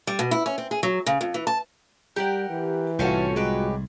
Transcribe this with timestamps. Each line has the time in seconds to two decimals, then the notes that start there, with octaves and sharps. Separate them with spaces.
0.07 G3
0.19 B2
0.31 E4
0.46 C#4
0.58 C4
0.71 G#4
0.83 F#3
1.06 C#3
1.21 F2
1.34 E3
1.47 A5
2.16 G3 G4 A#4 F#5
2.50 E3
2.99 C2 A2 C4 C#4 F4 F#4 A4
3.36 F#3 G#3 G4 B4